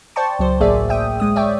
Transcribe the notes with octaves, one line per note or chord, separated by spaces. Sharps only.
C5 D5 G5 A5 C#6
C#2 F#3 C5
A1 A2 A#3 G#4 D5 E5
E5 G5 D#6
G#3 D#6
C#5 D5 E5 G5